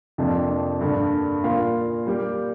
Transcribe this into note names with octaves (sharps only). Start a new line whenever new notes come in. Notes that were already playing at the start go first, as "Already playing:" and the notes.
F2 C3 F3 A#3 D4
G2 D3 A#3 D4
A#2 A#3 F4 A#4 F5
G3 A#3 G4